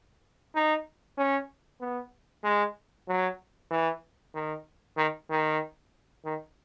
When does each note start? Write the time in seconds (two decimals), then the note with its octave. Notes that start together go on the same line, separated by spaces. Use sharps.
0.55 D#4
1.18 C#4
1.81 B3
2.44 G#3
3.08 F#3
3.71 E3
4.35 D#3
4.97 D#3
5.30 D#3
6.25 D#3